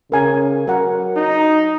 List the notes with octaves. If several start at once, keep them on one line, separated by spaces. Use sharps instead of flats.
C#3 A#4 G#5
F#3 A#4 F#5
D#4